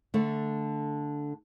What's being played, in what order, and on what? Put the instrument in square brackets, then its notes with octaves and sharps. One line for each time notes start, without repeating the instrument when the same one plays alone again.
[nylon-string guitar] D3 A3